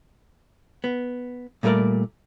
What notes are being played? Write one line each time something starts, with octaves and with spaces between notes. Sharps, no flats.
B3
A#2 G3 A3 G4 A#4 D5